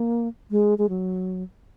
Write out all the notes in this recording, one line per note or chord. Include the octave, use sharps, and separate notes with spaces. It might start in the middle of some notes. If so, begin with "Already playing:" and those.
Already playing: A#3
G#3
G#3
F#3